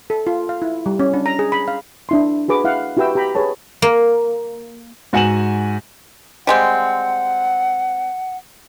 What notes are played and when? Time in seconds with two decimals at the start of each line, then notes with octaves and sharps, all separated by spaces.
0.10 A4
0.27 F4
0.49 F5
0.62 E4
0.86 G3
0.99 C#4
1.14 D4
1.26 A#5
1.39 G#4
1.52 B5
1.68 F5
2.09 D4 E4 C6
2.48 F#4 G#4 B4 D6
2.64 E4 F5 F#5
2.97 E4 F#4 G4 B4 G5 E6
3.15 G4 G5 A#5 B5
3.35 G#4 B4 C#5 A5
3.82 A#3
5.13 G#2 F#4 F#5 G#5 E7 F#7
6.47 G3 G#3 C4 F#5